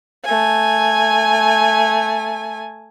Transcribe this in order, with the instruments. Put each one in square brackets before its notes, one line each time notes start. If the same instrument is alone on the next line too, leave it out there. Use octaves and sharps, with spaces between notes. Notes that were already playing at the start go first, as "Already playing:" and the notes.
[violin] A3 G#5